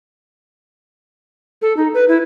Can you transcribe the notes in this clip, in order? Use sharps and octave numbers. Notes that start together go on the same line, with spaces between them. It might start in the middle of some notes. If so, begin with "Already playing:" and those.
A4
D#4
B4
E4